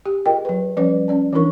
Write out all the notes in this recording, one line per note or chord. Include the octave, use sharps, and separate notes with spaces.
G4
F4 G#4 A#4 D#5 G5
F#3 B4
F3 G3 C#4 B4 C#5
C#4 D5 A5
E3 C#4 D4 E4 A#4 C#6